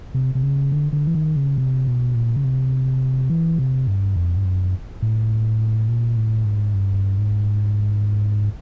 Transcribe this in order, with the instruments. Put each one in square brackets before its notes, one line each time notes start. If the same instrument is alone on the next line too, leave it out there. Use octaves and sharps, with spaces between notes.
[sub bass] C3
C3
C#3
D3
D3
E3
D#3
C#3
C3
B2
A#2
C#3
C3
E3
C3
G2
F2
G2
F#2
A2
A#2
A2
G#2
G2
G#2